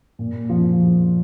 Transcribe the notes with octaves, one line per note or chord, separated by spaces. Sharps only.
A#2
F3